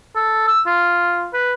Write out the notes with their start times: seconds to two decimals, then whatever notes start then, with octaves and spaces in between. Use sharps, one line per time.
0.16 A4
0.48 E6
0.67 F4
1.33 B4